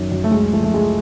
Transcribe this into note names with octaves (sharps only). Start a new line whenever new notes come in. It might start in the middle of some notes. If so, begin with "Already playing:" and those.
Already playing: F#2 D#3
F#2
A3
C#2 G#3
F3 A3
A3
C#2 G#3